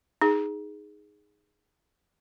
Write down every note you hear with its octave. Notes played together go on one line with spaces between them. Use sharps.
D#4 G#4